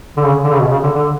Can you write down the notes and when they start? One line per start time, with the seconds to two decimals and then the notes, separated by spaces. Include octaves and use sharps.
0.17 D3
0.24 C#3
0.44 D3
0.52 C#3
0.59 B2
0.71 C#3
0.83 D3
0.95 D3